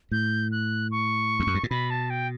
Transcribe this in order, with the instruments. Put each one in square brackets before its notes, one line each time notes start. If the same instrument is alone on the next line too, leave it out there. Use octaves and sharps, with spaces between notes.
[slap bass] A2 [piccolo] G6
[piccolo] F#6
C#6
[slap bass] E2
F#2
G2
A2
[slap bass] B2 [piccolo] B5
[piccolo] A5
G5